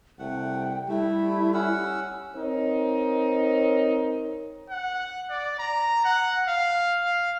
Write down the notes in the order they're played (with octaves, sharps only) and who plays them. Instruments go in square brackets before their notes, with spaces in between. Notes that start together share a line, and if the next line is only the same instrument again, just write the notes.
[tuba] C2 [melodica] A3 F#5 [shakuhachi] G5
[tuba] G3 [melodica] A3 [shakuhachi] E4
[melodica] C#4 F#5 E6
[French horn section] C4 D#4 A#4 C#5
[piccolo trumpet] F#5
D5
A#5
F#5
F5
F5